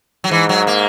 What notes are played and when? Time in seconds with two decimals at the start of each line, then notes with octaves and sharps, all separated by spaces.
0.24 F#3
0.30 G#2 E3
0.49 F#3
0.67 A#3